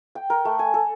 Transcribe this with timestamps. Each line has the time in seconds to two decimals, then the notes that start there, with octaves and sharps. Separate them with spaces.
0.15 G5
0.30 A#4
0.45 A3
0.59 G#5
0.74 A4